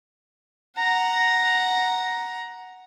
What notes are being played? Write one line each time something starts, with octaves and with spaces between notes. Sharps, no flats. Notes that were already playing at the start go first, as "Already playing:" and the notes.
F#5 A#5